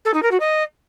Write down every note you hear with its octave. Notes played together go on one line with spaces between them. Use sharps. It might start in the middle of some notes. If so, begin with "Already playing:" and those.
A4
D#4
A#4
F#4
D#5